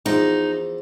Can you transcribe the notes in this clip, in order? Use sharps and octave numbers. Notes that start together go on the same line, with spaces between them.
E2 F3 D#4